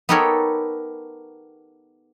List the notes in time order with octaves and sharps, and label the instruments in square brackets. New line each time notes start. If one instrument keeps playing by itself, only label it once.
[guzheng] B3 D#4 G4 A4 A#4 C#5